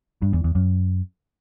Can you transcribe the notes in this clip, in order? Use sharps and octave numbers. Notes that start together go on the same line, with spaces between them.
G2
E2
E2
F#2